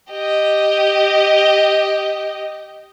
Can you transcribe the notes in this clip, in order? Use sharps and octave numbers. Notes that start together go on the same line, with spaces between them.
G4 D#5